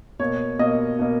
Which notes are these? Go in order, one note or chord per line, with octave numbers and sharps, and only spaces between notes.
B2 A#3 C#5
B2 A#3 D#5
B2 A#3